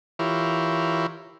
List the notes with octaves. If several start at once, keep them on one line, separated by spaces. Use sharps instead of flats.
E3 E4 F4 G4 A#4 C#5